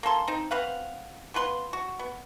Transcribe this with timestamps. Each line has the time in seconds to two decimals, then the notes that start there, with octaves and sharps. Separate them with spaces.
0.03 A#3 C#4 A4 C6
0.28 C4 D#4
0.51 C4 B4 F5 F#5
1.34 B3 F4 B4 C6
1.73 F#4
1.99 B3